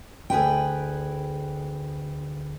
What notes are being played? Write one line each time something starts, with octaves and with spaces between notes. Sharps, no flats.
D2 G#4 B4 G5